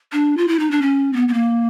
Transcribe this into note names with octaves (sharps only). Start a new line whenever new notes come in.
D4
F4
E4
D#4
D4
C#4
C4
B3
B3
A#3